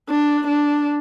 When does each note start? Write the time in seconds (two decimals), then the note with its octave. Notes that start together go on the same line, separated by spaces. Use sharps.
0.09 D4
0.47 D4